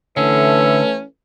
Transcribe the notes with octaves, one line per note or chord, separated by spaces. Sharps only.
D3 E3 A3 C#4 B4 E5